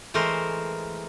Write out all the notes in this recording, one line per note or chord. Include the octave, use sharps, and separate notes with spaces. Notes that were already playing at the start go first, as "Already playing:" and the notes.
E3 G#3 A3 A#4 C5